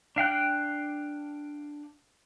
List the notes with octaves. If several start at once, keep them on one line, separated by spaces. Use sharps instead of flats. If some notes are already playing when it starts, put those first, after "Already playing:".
D4 F5 G5 F#6